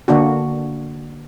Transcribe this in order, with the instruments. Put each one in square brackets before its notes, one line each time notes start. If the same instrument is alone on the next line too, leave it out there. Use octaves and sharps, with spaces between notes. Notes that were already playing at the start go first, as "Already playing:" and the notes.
[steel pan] D3 A#3 D4 F#4